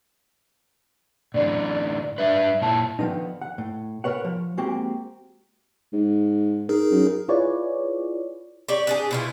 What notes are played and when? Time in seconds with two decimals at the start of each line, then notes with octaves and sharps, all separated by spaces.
1.34 A2 D3 E3 D5
2.18 G3 D4 B4 E5
2.62 A#2 E4 A5
2.99 D3 D#3 F3 B3 D#4
3.41 F#5
3.58 A2
4.04 A#4 B4 C#5 F#5
4.25 F3
4.57 G#3 A#3 C4 F#4 G4
5.93 G#2
6.69 D#4 G#4 A#4
6.91 F#2
7.28 E4 F4 G#4 B4 C#5 D5
8.69 G4 C#5 D5
8.87 D4 G4 G#4
9.11 B2 E4 F4